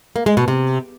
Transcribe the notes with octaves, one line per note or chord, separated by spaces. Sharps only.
A#3
G#3
B2
C3